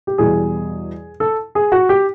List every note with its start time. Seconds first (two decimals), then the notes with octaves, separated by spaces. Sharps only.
0.07 G4
0.18 E2 B2 G3 G#4
1.20 A4
1.55 G#4
1.72 F#4
1.89 G4